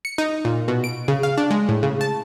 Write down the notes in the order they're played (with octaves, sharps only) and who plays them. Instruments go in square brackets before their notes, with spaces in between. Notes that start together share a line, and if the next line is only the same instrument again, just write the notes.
[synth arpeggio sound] C#7
D#4
A#2
B2
D7
C#3
F5
D4
G#3
A2
C#3
A5